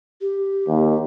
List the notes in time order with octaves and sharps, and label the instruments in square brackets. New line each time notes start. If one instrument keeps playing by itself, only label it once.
[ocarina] G4
[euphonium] D#2